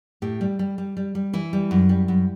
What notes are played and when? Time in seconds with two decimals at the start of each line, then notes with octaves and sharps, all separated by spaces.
0.22 A2 G4
0.41 G3
0.59 G3
0.78 G3
0.97 G3
1.15 G3
1.33 E3 E4
1.53 G3
1.71 F#2
1.89 G3
2.08 F#2